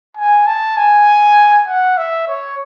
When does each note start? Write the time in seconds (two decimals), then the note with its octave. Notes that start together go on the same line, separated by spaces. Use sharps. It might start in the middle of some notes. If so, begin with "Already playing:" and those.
0.17 G#5
0.47 A5
0.77 G#5
1.67 F#5
1.98 E5
2.28 C#5